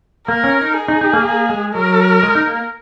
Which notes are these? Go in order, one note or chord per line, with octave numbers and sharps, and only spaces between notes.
A#3 A#4
C#4
D#4
G#4
D#4
D#4
A#3
A#3
G#3
F#3 A#4
G#3
D#4
A#3